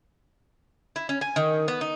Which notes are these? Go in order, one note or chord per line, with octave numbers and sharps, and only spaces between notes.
E4
C#4
G#5
D#3
B3
D#4